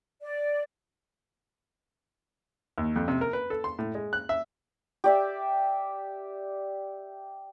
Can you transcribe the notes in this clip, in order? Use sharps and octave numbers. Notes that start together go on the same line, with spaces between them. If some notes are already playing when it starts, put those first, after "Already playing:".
D5
D#2
F2
C3
A#4
B4
A4
C6
A2
G#3
F#6
E5
G4 D5 E5